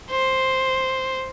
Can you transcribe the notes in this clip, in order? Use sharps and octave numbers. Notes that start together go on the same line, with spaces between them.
C5